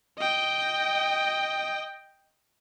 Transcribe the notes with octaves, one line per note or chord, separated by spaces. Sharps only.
D#5 G5